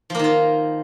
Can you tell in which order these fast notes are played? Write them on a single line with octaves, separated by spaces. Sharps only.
F3 A#3 D#3 F4